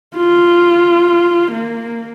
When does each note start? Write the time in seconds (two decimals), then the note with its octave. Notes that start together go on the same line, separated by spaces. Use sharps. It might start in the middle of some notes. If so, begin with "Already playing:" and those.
0.16 F4
1.52 A#3